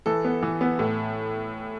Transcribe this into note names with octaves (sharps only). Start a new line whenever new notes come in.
E3 A4
B3
E3
B3
A2